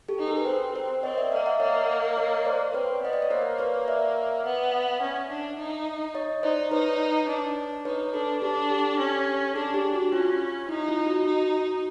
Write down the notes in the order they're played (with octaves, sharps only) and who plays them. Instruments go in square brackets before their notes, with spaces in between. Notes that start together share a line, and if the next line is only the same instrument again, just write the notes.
[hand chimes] G4 A4
[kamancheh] D#4
[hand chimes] G#4 A#4
B4
[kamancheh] C4 [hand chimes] A#4 C5
[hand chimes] A#4 C5
[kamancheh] C4 [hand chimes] C#5 D#5
[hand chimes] D5 E5
[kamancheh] A#3 [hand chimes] D#5 F5
[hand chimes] E5 F#5
[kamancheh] A#3 [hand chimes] C#5 D#5
[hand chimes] C#5 D#5
C5 D5
[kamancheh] C4 [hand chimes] B4 C#5
[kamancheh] B3 [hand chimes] D#5
[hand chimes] D5
C#5
[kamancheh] A#3 [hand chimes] A#4 C5
[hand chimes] B4 C#5
D5 E5
[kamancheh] B3
C#4
D4
D#4
[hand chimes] C#5 D#5
[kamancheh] D#4 [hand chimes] C5 D5
[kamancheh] D#4 [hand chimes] B4 C#5
[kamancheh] D4
[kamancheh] D#4 [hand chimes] B4 C#5
[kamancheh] D4 [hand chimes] A4 B4
[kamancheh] D4 [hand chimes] G4 A4
[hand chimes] G4 A4
[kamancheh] C#4
[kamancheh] D4 [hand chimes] G#4
[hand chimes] G4
F#4
[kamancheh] C#4 [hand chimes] F4
[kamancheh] D#4 [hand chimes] E4
[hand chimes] F4
F#4
[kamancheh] D#4